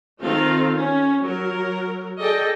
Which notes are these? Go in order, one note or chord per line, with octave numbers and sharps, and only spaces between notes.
D#3 C4 F4 A4 F5
C#4
F#3 A#4
G#4 A4 D5 D#5 G5